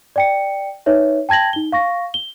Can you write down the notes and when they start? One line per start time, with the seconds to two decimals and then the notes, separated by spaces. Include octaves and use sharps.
0.16 D5 G5 C#7
0.86 D#4 B4 C#5 E5
1.29 G5 A5 G#6 A#6 F#7
1.53 D#4 G7
1.72 F5 C#6 A#6
2.14 G7